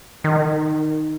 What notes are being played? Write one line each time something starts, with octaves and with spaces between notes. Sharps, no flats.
D#3